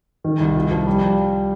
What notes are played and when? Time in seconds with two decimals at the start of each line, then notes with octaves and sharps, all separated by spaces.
0.24 D#3
0.40 C2
0.56 F4
0.71 F3
0.87 G3